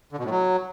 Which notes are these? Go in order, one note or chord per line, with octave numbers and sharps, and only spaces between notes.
D3
B2
A2
F#3